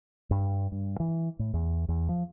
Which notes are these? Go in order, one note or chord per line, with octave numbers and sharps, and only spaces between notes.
G2
G2
E3
A2
E2
E2
F3